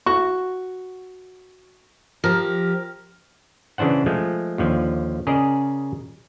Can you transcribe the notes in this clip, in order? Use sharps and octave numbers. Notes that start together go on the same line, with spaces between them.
F#4 C#6
F3 G4 A#4
C#3 E3 D4 C5 F#5
F3 G#3 A3
D#2 D3 F3
C#3 G#4 A#4 D5 D#5